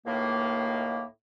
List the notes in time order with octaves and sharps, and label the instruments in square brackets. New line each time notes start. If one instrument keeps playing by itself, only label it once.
[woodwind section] C#2 A2 D#3 A#3